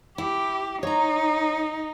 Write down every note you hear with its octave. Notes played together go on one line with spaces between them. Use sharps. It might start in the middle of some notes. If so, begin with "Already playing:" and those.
E4 G4
D#4 C#5 A#5